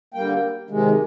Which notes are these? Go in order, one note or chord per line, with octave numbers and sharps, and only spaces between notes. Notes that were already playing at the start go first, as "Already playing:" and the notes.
D3 G3 A#3 G5
C3 D#3 G#3